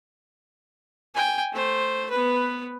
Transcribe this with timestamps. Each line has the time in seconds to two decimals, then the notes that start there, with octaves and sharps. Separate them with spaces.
1.14 G5 G#5
1.52 A3 C5
2.10 B3 B4